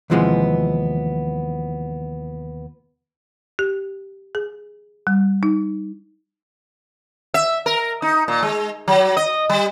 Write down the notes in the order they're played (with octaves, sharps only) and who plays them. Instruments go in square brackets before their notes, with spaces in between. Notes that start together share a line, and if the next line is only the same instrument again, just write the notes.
[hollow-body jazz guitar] D#2 C3 E3 F3 G#3 B3
[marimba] G4
G#4
G3
D#4
[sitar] E5
A#4
D#4
A#2
G#3
F#3
D#5
G3